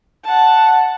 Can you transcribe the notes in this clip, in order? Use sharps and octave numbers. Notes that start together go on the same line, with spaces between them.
F#5 A5